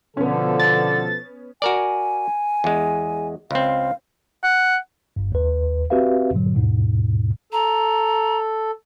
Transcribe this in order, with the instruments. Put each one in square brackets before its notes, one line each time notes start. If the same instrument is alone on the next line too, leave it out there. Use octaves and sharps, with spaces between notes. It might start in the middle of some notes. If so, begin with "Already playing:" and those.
[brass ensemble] B2 F3 A4 [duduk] D3 [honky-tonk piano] B3 C#4
[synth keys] A6
[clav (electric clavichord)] F#4 A#4 D5 [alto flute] G#5
[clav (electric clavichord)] E2 G#3
[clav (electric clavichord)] C#2 C4 [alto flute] F5
[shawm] F#5
[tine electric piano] G1 G2
D#2 B4
C4 F#4 G4 B4 E5 F5
G2 A#2 D3 F#3
D#2 G#2 B2
[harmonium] A4 [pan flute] A#5